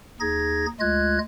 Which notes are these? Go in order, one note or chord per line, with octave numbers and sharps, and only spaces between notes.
D#2 D#4 G#4 G#6 A#6
D2 G#3 F4 D#5 F#6 G#6